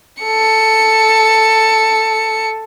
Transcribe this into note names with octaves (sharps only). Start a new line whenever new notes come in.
A4 C#7